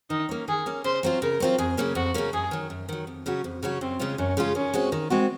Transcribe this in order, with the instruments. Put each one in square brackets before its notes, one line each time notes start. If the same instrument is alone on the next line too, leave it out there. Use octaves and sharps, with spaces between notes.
[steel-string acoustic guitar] D#3 [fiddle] D#4
[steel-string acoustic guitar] A#3 C#4
[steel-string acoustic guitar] D#3 [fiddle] G#4
[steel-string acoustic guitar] A#3 C#4
[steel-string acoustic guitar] C#3 [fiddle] C5
[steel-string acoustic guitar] F#3 C4 F4
[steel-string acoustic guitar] C#3 [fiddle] A#4
[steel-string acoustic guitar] F#3 C4 F4
[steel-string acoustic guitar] F2 [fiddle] G#4
[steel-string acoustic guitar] C#3 F#3 A#3 C#4
[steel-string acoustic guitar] F2 [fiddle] F#4
[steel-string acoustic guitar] C#3 F#3 A#3 C#4
[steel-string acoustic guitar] F#2 [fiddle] G#4
[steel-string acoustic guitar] D#3 F#3
F#2
D#3 F#3
F2
C#3 F#3 C#4 F#4
F2
C#3 F#3 C#4 F#4
[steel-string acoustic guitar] F#2 [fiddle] C4
[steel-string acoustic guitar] C#3 G#3 C#4 F4
[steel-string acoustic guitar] F#2 [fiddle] C#4
[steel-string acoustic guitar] C#3 G#3 C#4 F4
[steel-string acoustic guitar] D#3 [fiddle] C#4
[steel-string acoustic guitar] G#3 C4 F#4
D#3
G#3 C4 F#4